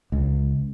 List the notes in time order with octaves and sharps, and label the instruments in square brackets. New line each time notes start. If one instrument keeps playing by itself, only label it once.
[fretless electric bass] C#2